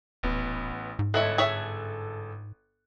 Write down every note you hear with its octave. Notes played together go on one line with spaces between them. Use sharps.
D#1 A1 B3
G#2
G1 G#3 E4 A4 C#5 F#6
G#4 C#5 E5